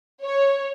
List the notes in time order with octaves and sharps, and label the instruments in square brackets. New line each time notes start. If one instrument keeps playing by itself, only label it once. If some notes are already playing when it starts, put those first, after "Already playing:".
[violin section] C#5